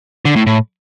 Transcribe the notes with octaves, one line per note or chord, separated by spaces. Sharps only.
D3
A2
A2